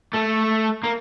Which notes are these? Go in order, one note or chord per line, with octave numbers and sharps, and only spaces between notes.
A3
A#3